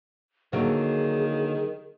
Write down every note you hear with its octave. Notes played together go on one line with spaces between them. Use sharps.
D3 D#3 F#3 A#3 G#4